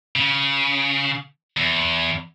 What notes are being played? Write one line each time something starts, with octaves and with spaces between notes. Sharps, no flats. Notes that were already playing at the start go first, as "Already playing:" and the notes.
C#3
E2